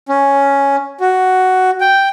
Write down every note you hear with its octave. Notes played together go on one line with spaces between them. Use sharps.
C#4
F#4
G5